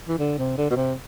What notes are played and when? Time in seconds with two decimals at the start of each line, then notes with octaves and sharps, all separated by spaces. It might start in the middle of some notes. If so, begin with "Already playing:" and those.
0.08 E3
0.18 D3
0.38 C3
0.58 D3
0.70 B2
0.76 C3